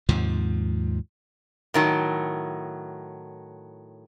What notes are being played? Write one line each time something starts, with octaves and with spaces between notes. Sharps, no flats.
D#2 G#2 C3 F3
A2 D#3 F#3